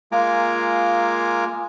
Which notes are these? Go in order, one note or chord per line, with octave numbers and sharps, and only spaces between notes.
G#3 A#3 F4 G#5 A#5 D6